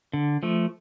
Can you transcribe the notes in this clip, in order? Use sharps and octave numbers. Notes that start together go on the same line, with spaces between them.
D3
F3 A3